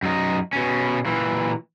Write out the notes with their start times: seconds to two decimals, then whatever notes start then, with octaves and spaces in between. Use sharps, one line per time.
0.03 F#2 D#4
0.53 B2 C#4
1.06 A#2 E3